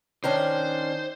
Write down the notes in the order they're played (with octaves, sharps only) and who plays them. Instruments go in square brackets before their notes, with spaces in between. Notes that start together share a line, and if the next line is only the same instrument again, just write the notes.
[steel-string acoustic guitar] D#3 C#4 D4 [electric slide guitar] C5